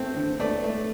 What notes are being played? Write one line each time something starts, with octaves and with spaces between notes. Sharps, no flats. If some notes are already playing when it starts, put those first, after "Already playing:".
Already playing: A3 C4
D3
A3 D5
A3